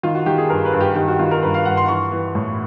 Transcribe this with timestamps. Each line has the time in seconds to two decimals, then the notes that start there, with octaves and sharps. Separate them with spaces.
0.03 D#3 F4
0.15 F#4
0.26 D#3 G4
0.38 G#4
0.50 G2 A#4
0.65 B4
0.73 G2
0.81 G4
0.95 D#3 G4
1.08 F#4
1.19 D#3 F4
1.31 A#4
1.42 G2 B4
1.54 F5
1.65 G2 F#5
1.77 C6
1.88 E3 C#6
2.12 E3
2.35 A2